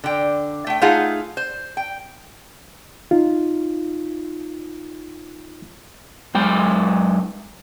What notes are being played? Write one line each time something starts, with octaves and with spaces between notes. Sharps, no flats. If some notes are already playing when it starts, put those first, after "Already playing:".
D3 G5
A3 G5
A3 D#4 F4 G#4 F5 F#5
C5
G5
D#4 F4
F#2 G#3 G5